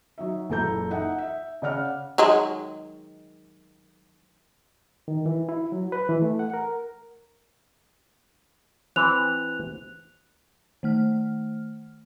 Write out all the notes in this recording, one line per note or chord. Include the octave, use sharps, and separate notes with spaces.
F#3 D#4 E5
F#1 A#2 E3 A4 A#5 G6
D#4 E5 F#5
E5
C#3 D5 F#5 F6
D#3 F#3 G#3
D#3
E3
E4
F#3
B4
E3
A3
F#5
A#4
E3 C4 B4 F#6 F7
D#3 A3 F6